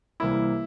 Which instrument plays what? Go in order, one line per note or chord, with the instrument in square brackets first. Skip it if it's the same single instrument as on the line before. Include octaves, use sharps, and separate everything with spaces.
[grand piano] C2 C3 E3 G3 A#3 E4